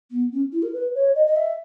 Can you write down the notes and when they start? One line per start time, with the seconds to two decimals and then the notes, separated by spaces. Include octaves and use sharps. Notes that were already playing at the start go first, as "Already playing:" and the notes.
0.11 B3
0.32 C#4
0.52 E4
0.62 A#4
0.73 B4
0.95 C#5
1.15 D#5
1.26 D#5
1.36 E5